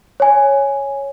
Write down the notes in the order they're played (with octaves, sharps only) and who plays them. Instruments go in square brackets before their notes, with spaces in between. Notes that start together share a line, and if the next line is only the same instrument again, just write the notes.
[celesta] C#5 G#5